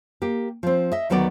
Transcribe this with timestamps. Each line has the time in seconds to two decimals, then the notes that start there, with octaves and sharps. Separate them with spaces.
0.22 A#3 G4
0.63 F3 C4
0.92 D#5 E5
1.10 D2 D#3 F#3 B3 B4 D5